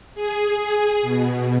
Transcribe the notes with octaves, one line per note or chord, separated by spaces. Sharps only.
G#4
B2